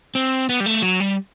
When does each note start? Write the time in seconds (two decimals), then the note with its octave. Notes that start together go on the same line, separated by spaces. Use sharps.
0.15 C4
0.49 B3
0.60 G3
0.66 A3
0.82 F#3
1.00 G3